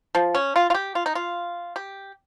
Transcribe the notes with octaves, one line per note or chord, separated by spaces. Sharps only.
F3
C#4
F4
F4
G4
F4
D#4
F4
G4